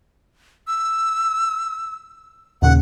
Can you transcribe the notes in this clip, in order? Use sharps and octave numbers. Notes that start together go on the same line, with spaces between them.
E6
D#2 A#2 C#3 F#5